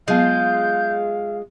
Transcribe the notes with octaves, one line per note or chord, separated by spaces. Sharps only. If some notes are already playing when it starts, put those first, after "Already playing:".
F#3 G#3 B3 F4 F5 G6